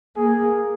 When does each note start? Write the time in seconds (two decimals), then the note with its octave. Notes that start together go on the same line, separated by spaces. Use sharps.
0.16 A#3 G#4